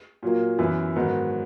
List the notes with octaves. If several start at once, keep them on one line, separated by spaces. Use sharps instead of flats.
A#2 F#3 A#3
F#2 E3 B3 E4 B4
G#2 D#3 F#3 B3